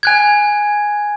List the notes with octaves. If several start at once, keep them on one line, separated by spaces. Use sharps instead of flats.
G#5 F#6 G#6